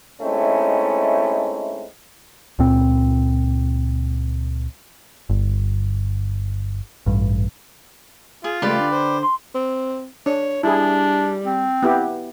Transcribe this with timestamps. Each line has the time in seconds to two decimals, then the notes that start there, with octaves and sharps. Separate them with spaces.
0.21 G#3 A3 C4 C#4 D#4 E4
2.59 C#2 A#2 C4
5.30 G1
7.06 A1 G2
8.44 F4 G#4
8.62 C#3 G#3 A3 G4 B4 D5
8.78 D3
8.92 C5
9.23 C6
9.55 C4
10.26 D4 C#5
10.63 G3 D4 E4 G#4
11.46 C4
11.83 B3 E4 G4